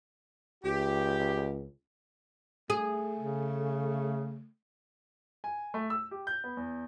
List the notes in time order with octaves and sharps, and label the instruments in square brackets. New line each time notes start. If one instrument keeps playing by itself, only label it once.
[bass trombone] C#2 [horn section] G4
[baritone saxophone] A3 [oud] G#4
[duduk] C#3
[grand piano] G#5
A3
E6
G4
G6
B3
E2